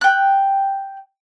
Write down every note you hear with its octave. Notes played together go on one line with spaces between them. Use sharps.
G5 F#6